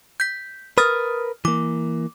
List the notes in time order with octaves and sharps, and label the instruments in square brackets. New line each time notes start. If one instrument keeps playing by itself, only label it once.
[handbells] G6 B6
[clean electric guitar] A#4 B4 [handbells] D#6 F6 A6
[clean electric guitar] E3 A#3 [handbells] D6